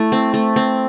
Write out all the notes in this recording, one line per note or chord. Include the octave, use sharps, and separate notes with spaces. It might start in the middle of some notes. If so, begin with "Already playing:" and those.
Already playing: A3 E4
C4
A3
C4